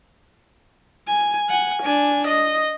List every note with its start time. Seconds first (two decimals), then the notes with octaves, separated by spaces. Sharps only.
1.08 G#5
1.50 F#5 G#5
1.83 D4 G#5
2.28 D#5